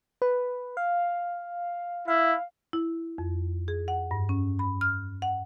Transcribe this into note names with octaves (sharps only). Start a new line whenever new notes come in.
B4
F5
E4 F5
E4
F2
G#4
F#5
G2
C#4
B5
F6
F#5